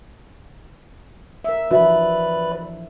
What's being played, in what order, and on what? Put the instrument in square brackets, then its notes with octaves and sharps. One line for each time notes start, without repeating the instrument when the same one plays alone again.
[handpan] A#4 E5
[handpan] E3 F3 D4 [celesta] F#4 E5 [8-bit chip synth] B4 D5 B5